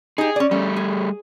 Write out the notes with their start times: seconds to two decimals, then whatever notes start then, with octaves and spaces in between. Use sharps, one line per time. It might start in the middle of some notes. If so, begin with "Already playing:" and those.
0.18 D#4 G4 G#4
0.36 C#4 D5
0.51 G3 A3 C#4
0.76 G#4